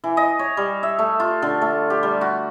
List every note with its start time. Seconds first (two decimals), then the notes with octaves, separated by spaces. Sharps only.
0.04 E3
0.17 D#5
0.39 C#5
0.57 G3
0.83 E5
0.99 A3
1.20 F4
1.42 D3
1.61 A3
1.90 G4
2.03 G3
2.21 F#4